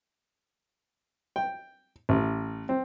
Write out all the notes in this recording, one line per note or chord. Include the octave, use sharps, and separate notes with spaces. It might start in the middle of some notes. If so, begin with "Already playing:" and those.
G5
A1
C4